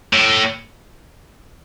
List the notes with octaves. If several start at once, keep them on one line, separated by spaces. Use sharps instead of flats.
A2